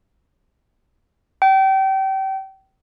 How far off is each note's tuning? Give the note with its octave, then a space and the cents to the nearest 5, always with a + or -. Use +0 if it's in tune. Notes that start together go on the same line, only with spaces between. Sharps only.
G5 -30